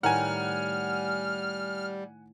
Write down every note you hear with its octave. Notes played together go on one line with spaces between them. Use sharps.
A2 D#3 G3 A#4 F#5 G#5 F6